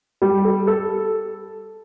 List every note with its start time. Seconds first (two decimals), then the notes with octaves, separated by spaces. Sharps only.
0.22 G3
0.44 A4
0.67 A4